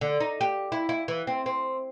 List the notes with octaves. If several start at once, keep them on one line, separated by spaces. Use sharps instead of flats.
D3
D#4
G4
E4
E4
E3
C4
C4